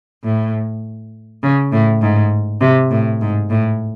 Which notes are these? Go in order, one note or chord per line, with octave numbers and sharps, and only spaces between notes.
A2
C#3
A2
G#2
C3
A2
G#2
A2